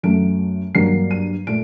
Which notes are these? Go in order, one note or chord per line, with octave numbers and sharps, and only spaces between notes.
F#2 F#3 A3 D7
G2 F#3 A#3 C7
D#7
A#2 A3 D7